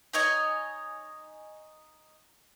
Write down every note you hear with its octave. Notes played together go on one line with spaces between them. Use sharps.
D#4 C#5 D#5 G#5